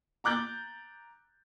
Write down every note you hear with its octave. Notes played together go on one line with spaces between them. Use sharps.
A#5 D6 F#6 G6 A6